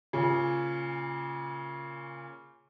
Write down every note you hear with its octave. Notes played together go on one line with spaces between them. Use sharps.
A#2 C#3